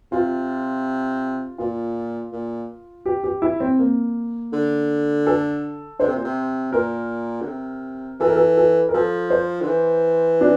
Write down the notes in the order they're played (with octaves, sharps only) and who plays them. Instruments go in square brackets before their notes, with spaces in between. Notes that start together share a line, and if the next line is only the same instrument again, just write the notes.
[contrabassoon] C3 [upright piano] F4
[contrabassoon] A#2 [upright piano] F4
[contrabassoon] A#2
[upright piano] G4
G4
E4
C4
A#3
[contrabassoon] D3
[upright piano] A4
[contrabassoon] D3 [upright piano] C5
[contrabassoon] C3
A#2
C3
[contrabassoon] A#2 [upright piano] A#4
[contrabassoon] D3
C3
[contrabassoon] E3 [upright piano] A4
[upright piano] A#4
A4
A4
A#4
[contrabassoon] F3 [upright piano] A4
[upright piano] C5
[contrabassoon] D3
E3
[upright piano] D4